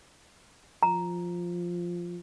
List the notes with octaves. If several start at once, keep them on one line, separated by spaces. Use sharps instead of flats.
F3 A#5